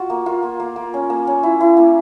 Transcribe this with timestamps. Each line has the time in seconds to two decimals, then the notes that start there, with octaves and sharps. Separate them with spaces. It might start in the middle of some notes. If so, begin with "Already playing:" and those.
Already playing: F4 F#4
0.10 A#3
0.26 A#3 F4
0.43 A#3
0.60 A#3
0.76 A#3
0.94 C#4
1.10 A#3
1.27 C#4
1.43 E4
1.60 E4
1.77 A#3